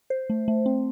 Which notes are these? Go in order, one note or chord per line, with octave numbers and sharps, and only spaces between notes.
C5
A3
A3
C4